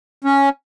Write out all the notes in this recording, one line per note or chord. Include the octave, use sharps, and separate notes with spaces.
C#4